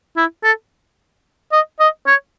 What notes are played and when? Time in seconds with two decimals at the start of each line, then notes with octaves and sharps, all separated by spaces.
0.16 E4
0.43 A4
1.52 D#5
1.80 D#5
2.07 C#5